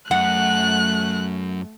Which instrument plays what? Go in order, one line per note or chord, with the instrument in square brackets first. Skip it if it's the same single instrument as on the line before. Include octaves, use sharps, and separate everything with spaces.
[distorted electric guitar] F#2 [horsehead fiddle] A3 [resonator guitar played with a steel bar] F#5 [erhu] F#6